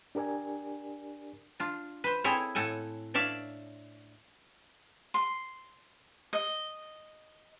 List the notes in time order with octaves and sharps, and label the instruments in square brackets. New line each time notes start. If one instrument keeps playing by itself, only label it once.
[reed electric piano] D4 G4 A#4 D5 G#5
[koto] D4 F4
B4 C5
C4 E4 G#4 A4 C#5
A2 A4 F#5 G#5
D4 C#5 D5 E5 F5
[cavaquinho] C6
D#5